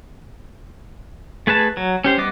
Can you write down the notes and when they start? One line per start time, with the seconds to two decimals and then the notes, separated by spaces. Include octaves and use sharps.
1.47 A3 G#4 B4 A5
1.77 F#3
2.04 C#4 G4 C5
2.17 G3 B3 D#5 D6